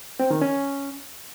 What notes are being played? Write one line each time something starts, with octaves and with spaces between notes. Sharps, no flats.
C4
D#3
C#4